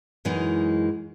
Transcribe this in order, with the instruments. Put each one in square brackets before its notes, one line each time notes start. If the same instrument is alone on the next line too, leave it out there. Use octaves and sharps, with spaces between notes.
[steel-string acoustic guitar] F#2 E3 G#3 D#4